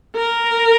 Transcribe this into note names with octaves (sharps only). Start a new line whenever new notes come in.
A#4